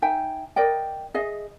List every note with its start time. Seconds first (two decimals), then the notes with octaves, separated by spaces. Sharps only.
0.02 D#4 E5 G5 G#5
0.56 A#4 D5 D#5 G5
1.14 G#4 D#5 E5